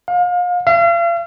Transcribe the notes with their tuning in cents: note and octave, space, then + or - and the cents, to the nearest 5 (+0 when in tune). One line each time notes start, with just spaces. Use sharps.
F5 +35
F5 -40